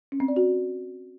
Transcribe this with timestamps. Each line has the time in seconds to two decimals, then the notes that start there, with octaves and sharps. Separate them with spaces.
0.12 C#4
0.20 C4
0.28 D5
0.36 F#4